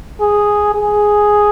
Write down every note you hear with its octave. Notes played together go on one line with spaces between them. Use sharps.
G#4
G#4